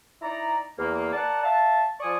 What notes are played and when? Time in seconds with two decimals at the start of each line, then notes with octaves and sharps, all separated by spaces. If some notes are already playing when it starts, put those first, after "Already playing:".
0.22 D#4 E4 D5 A#5
0.77 E2 A#3
1.13 A#4 D5 F#5 A5
1.42 E5 F5 A5
2.00 F3 D5 G#5 C#6 D#6